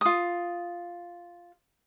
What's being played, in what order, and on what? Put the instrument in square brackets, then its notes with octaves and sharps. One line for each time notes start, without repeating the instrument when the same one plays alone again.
[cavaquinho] F4 D#6